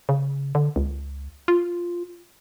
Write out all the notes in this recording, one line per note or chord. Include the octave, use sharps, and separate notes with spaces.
C#3
D3
C#2
F4